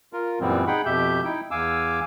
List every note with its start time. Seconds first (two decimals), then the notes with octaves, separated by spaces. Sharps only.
0.13 F4 A#4
0.41 F#2 A#2 E3 G3 B3 C4
0.67 D#4 G#4 F#5 G5 B5
0.85 F2 B2 G4 E5 G6
1.25 D#4 E4 G5
1.51 E2 F5 G#5 D6 E6